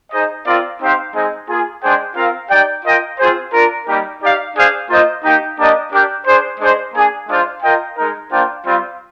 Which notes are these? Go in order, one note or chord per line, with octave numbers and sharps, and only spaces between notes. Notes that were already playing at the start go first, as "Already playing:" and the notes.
D#4 G#4 C5 D#5
C4 F4 A#4 D5 F5
C4 D#4 G4 C5 F5
G#3 C4 D#4 G#4 D#5
A#3 F4 G#4
G#3 D4 G#4 C5 G5
C4 F4 A#4 F5
D#4 G4 D5 G5
F4 A#4 D#5 G5
C4 F4 G#4 C5
D4 F4 A#4
G3 A#3 D#4 G4 A#4
D#4 G4 D5 F5
D4 G#4 C5 F5
A#3 F4 C5 D#5
A#3 D#4 G4
A#3 D4 G4 A#4 D#5
D4 G4 A#4 D5 G5
D4 G#4 C5
G#3 D4 G#4 C5 D#5
A#3 D4 G#4
G#3 D4 F4 C5
F4 A#4 D#5 G5
G#3 D#4 A#4
A#3 D4 F4 C5 G5
G3 C4 F4